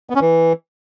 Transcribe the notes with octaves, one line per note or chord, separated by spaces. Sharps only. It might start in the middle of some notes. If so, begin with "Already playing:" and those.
B3
C#4
E3